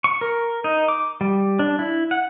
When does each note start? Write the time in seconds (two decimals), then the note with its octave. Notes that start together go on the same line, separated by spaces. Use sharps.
0.04 C#6
0.21 A#4
0.64 D#4
0.88 D6
1.21 G3
1.59 D4
1.79 E4
2.11 F#5